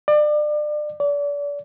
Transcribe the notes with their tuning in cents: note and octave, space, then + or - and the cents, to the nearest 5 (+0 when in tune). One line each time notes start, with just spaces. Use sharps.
D5 +30
D5 -35